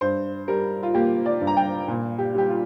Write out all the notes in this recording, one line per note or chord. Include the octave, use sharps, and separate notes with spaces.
G2 C5
G3 A#4
F4
A#3 G4
D5
G2
A#5
G5
A#2
G4
G3 G4
F4